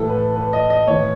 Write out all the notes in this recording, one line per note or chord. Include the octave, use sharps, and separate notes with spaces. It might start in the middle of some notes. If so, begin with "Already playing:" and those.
Already playing: A2 E3 A4
B4
B4
D#5
D#5
A2 E3 C#5